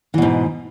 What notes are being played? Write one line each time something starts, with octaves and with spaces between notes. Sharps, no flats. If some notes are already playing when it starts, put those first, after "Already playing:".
G#2 B2 E3